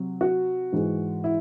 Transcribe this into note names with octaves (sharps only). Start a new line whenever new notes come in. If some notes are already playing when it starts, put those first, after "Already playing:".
Already playing: C3 F#3
F#4
G#2 E3 G#3
E4